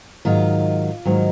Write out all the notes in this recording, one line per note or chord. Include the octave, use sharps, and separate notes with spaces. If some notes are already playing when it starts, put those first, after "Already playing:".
G#2 D#3 F#3 F4
G#2 D#3 F#3